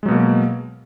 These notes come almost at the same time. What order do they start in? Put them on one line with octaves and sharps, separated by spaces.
G#3 F#3 B2 A#3